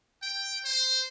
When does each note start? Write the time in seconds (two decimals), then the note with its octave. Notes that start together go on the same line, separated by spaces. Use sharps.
0.22 G5
0.64 C5